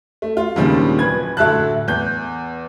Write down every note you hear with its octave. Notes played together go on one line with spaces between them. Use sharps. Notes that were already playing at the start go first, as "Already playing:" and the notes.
A3
F4
D#2 A#2 C#3 F3 G3 D4
D1 B4 G#6
D2 A2 E5 A5 F#6
E2 G6